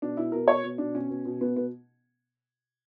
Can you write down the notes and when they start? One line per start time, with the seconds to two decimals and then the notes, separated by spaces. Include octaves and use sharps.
0.02 B2 D4
0.17 B2 E4
0.32 B2 A#4
0.48 B2 C#5
0.64 B2
0.78 B2 D4
0.95 B2 C#4
1.10 B2
1.25 B2
1.41 B2 B3
1.56 B2 B3